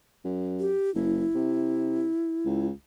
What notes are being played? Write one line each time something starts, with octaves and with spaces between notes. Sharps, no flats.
F#2
G4
F#1 E4
C3
C#2